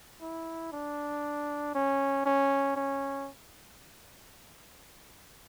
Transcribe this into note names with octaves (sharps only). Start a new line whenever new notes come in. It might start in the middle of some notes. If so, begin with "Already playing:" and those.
E4
D4
C#4
C#4
C#4